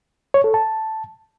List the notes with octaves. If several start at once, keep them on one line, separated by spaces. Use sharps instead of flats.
C#5
A4
A5